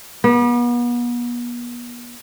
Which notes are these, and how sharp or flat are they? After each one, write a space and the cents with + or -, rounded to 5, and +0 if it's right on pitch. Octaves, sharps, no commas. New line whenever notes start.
B3 -40